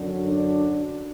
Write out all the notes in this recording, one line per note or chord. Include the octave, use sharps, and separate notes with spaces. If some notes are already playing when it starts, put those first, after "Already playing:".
Already playing: F#2 D3 F#3
D4